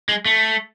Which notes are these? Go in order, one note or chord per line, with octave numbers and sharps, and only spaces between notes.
G#3
A3